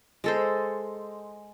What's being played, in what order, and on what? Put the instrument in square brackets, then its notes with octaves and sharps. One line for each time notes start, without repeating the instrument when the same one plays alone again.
[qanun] G#3 A4 C5